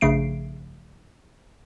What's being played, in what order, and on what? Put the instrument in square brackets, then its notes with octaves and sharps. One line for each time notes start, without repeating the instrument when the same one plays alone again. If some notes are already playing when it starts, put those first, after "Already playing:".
[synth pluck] A#1 G2 C#3 A3 C7 D7